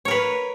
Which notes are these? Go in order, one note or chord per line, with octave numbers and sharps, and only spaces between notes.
A#4 B4 C#5